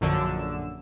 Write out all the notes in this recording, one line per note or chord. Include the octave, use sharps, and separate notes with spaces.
A#1 F#2 D3 E6